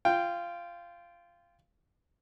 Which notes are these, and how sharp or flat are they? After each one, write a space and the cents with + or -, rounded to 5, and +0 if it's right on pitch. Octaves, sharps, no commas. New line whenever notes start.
F4 -15 G5 +0